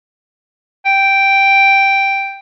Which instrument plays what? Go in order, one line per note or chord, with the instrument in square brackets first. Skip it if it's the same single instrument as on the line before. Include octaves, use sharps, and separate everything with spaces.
[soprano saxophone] G5